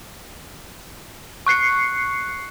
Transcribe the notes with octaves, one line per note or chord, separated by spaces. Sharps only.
C#6 F#6 C7 C#7